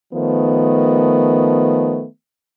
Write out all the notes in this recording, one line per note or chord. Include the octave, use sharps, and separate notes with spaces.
D#3 F3 A3 B3